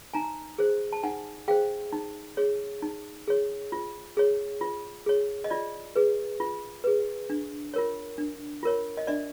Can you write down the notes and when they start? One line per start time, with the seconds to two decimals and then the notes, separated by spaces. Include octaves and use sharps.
0.13 D#4 G#5 A#5
0.58 G#4 C5
0.93 A5
1.03 D#4 F#5 G#5
1.48 G#4 C5 F5 G5
1.93 D#4
2.37 G#4 C#5
2.82 D#4
3.28 G#4 C#5
3.72 F4
4.17 G#4 C#5
4.61 F4
5.06 G#4 C#5
5.44 D#5
5.50 F4 D5
5.96 G#4 B4
6.40 F4
6.84 G#4 B4
7.30 D4
7.74 F4 A#4 C#5
8.18 D4
8.63 F4 A#4 C#5
8.97 D#5
9.07 D4 D5 E5